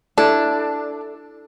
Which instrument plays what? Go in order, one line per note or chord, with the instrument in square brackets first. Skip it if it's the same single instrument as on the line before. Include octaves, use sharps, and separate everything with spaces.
[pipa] D4 [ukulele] E4 A4